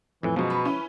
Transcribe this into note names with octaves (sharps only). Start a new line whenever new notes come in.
F2 A2 E3
F#2 B2 F3 G#3
B4
C#4 E4